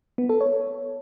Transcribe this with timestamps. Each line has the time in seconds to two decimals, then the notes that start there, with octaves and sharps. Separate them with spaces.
0.18 B3
0.29 A4
0.41 C#5